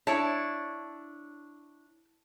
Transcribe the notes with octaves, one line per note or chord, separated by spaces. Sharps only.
D4 E4 C#5 A5